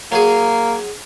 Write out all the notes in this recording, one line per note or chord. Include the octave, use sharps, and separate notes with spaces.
F#3 A#3 G#4